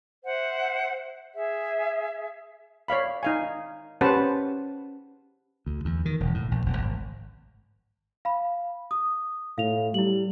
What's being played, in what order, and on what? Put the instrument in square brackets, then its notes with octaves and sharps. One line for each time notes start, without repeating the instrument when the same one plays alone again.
[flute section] C5 E5 F#5
G#4 E5
[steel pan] C#5 D5 F5 B5
D#4 F5 G#5
C#4 G4 B4 C5 F#5 A5
[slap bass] D2
E2
D#3
E1
A2
A#1
E1
G#1
[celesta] F5 B5
D#6
[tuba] A2 [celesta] F5 F7
[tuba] G3 [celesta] E4 F#7